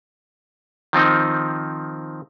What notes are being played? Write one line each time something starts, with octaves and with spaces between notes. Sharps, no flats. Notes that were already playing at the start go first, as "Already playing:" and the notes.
D#3 F3 C4 D#4